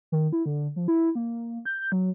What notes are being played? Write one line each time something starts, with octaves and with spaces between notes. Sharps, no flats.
D#3
E4
D3
F3
E4
A#3
G6
F#3